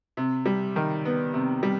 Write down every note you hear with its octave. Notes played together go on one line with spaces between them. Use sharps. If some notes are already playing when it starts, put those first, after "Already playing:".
C3
G3
D#3
B3
C3
G3